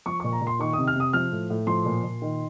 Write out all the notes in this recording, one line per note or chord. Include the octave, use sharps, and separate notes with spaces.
F3 C#6
A#2 C#6
A#5
A#2
C6
D#3 C#6
D#6
C3
F6
C3 D#6
F3 F6
A2
A2
F3 C6
A#2
A#2
D#3